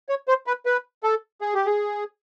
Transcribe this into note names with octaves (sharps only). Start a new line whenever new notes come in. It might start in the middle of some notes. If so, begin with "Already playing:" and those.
C#5
C5
B4
B4
A4
G#4
G4
G#4